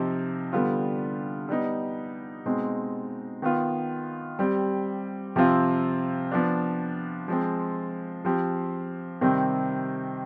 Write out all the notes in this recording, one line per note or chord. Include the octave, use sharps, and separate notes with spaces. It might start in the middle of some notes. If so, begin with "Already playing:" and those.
Already playing: C3 F3 C4 D#4 G4
D3 G3 B3 F4
G3 B3 D#4
B2 G#3 C4 D#4
D#3 B3 F4
G3 C4 G4
C3 F3 C4 F4
F3 B3 D4
F3 G#3 C4
F3 C4 G4
C3 D#3 G3 C4